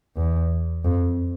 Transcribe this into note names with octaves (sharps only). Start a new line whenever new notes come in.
E2
F2